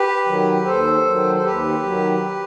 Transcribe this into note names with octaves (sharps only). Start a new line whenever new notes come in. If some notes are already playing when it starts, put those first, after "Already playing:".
Already playing: G4 B4
D#3 F#3
D#2 A4 C5
D#3 F#3
C5
D#2 G4 B4
D#3 F#3